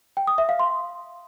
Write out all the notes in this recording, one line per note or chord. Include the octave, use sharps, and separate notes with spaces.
G5
D#6
E5
F5
C6